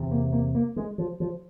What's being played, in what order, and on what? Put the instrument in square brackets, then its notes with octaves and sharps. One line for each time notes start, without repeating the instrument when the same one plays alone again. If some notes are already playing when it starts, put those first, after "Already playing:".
Already playing: [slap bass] E2 C3
A#3
A#3
A#3
G#3
F3
F3